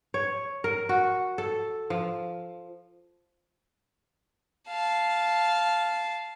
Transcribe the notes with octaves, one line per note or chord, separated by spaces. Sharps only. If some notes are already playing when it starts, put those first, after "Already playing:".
C#5
A#4
F#4
A4
F3
F5 A5